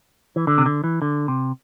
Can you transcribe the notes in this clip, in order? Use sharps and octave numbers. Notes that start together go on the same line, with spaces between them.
E3
D3
C3
D3
E3
D3
C3